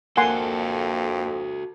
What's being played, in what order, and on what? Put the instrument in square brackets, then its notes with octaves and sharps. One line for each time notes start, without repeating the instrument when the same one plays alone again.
[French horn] F2 [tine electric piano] A#3 [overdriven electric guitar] F#4 A4 [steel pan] F#5 G#5 C6